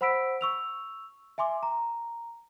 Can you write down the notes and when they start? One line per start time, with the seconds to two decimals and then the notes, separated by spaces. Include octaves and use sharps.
0.01 C5 F#5 B5 E6 B6 D7
0.41 C#6 E6 F7
1.38 E5 G#5 C6 D6
1.63 A#5